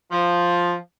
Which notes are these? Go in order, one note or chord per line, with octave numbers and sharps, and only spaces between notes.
F3